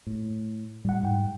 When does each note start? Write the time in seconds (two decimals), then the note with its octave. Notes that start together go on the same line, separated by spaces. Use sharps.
0.07 A2
0.85 A2 G3 F#5
1.03 G#2 G5